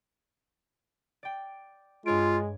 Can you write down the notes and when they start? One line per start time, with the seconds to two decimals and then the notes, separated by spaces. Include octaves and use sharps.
1.23 D5 G5
2.06 G2 G#3 F4 C#5 D7